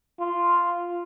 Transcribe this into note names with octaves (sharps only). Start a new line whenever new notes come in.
F4